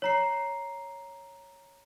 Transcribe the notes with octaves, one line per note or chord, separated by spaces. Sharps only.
C#5 A#5 C7